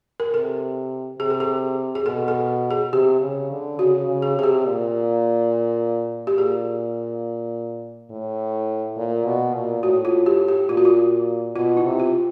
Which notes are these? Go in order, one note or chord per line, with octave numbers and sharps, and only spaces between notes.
A#4
C3 A4
C3 G#4
A4
G#4
G#4
B2 A4
A4
G#4
C3 G4
C#3
D3
C#3 F#4
C#3
G#4
C3 G#4
G4
A#2
G4
A#2 G#4
A2
A#2
B2
A#2
A2 F#4
F4
G4
G4
A#2 F4
F#4
F4
B2 F4
E4
C3
F4